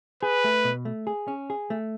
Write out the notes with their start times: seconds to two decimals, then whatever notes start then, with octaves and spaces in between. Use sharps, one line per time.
0.23 G#4 B4
0.44 A3
0.65 B2
0.85 A3
1.07 G#4
1.28 C#4
1.50 G#4
1.70 A3